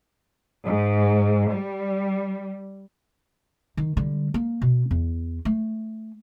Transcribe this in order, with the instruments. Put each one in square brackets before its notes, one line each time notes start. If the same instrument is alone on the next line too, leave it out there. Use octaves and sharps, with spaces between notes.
[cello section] G#2
G3
[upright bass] D#3
D3 G3
A#3
B2
E2
A3